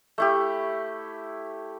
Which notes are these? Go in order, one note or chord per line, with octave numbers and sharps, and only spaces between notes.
A3 E4 G4